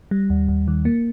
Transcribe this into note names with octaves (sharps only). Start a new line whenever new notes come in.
G3
D#2
D#2
D#3
A#3